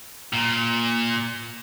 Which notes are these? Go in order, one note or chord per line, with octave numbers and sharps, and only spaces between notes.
A#2